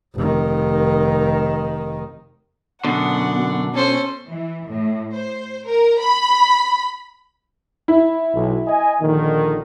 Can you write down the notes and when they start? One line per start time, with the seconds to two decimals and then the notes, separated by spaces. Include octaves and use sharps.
0.16 F1 D#3
2.85 F#2 B2 D3 D4 F#5
3.75 C#4 A4 C5
4.27 E3
4.65 A2
5.13 C5
5.66 A#4
6.00 B5
7.88 E4
8.34 B1
8.67 D#5 G#5
9.01 A#1 D3 D#3